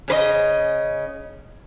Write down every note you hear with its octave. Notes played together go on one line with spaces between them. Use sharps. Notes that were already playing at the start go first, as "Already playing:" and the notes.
C#3 B4 D#5